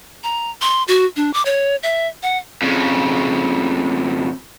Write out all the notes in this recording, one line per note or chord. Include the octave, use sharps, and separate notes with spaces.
A#5
C6
F#4
D4
D6
C#5
E5
F#5
F2 C#3